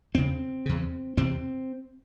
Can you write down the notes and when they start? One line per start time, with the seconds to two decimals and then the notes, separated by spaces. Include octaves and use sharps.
0.15 E2 C#3 C4
0.66 E2 C#3
1.17 E2 C3 C4